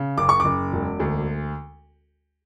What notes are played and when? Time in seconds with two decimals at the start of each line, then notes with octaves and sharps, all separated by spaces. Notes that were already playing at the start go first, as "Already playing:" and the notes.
Already playing: C#3
0.18 F#1 D6
0.29 C#6
0.40 F#1 D6
0.73 E1
1.00 D2